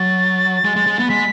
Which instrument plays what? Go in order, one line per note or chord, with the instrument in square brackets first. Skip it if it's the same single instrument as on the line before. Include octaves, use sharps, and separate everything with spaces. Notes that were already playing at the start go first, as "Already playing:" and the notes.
Already playing: [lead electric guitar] F#3 [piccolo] A6
[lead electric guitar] G#3
G#3
G#3
B3
[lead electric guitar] G#3 [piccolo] B6